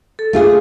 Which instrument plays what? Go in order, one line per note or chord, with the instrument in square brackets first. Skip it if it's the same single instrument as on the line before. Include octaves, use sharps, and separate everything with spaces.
[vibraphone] A4
[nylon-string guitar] A3 F4 G#4